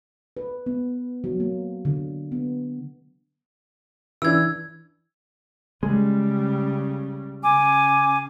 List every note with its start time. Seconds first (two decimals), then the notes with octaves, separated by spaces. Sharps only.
0.37 B4
0.66 B3
1.24 F#3
1.40 A#3
1.85 D3
2.32 B3
4.22 E3 D4 E6 G#6
5.83 C#3 G3 G#3
7.43 C#3 G#5 D6